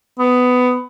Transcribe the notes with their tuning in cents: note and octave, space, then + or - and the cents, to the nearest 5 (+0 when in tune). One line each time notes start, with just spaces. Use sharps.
B3 +15